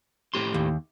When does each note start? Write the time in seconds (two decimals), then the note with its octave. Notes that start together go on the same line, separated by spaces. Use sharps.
0.34 A2 G4 C6
0.54 D#2